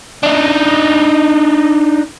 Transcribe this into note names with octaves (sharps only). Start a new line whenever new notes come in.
D4 D#4